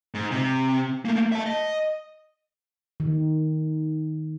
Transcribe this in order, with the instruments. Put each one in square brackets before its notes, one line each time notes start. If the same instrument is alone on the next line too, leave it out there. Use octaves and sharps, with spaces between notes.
[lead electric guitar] G#2
C3
A3 A#3
E5 A5
D#5
[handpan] D#3